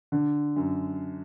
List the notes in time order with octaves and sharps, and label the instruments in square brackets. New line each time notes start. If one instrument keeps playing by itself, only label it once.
[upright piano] D3
F#2